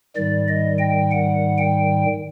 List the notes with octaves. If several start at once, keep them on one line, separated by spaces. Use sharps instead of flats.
G#2 D#3 G3 D5
D#5
G5
F#5
G5